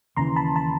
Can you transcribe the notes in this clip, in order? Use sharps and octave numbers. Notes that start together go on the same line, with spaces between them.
D#2 C#3 E3 A#5 C6
A5 B5
A5 B5